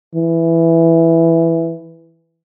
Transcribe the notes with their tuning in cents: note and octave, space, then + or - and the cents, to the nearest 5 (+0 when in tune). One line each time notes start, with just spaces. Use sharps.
E3 +5